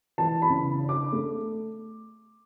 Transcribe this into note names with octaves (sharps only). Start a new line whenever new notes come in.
E3 A5
B5
C#3
D4
D6
A3